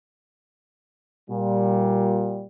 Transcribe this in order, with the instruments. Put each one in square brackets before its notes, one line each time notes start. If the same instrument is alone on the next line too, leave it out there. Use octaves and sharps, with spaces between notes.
[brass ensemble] A#2 G3